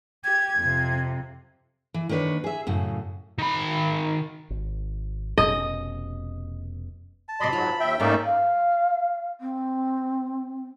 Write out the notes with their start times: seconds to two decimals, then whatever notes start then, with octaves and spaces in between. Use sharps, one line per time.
0.24 G4 G#6
0.57 F2 C3
1.94 E3
2.09 D#3 A#3 D4 B4 C#5
2.44 G#4 E5
2.67 F#2 A2 C#3
3.38 D#3 B5
4.50 G#1
5.38 F1 B2 C#4 D#5
7.29 A5
7.41 F#2 C3 D5 D#5 B5 C6
7.53 G#2 F#3 F4
7.80 D#2 E5 G5
8.00 G#2 A3 A#3 C#4 D#4 D5 E5
8.24 F5
9.40 C4